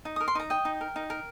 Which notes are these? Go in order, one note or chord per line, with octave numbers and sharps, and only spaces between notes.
D#4
A#4 D#6
C6
D#4 A#5
D#5 G5
D#4
A#4
D#4
A#4